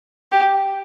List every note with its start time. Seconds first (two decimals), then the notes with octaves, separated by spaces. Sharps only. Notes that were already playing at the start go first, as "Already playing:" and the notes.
0.32 G4